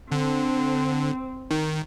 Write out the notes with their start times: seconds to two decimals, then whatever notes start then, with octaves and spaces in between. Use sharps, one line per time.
0.12 D3 C4
1.51 D#3